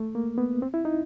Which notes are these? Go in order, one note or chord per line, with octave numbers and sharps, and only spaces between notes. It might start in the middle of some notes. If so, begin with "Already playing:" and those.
Already playing: A3
A#3
B3
C4
E4
D#4